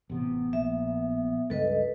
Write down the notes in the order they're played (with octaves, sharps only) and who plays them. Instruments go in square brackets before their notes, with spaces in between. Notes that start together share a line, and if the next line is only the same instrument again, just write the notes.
[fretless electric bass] A1 C3 [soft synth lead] B3
[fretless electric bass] A#1 [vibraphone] E5
[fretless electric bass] C#2 G2 [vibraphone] A4 B4 D#5